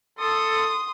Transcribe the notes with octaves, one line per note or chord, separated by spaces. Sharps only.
A4 C6 D#6